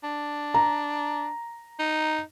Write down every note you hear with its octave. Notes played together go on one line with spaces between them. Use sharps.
D4
A#5
D#4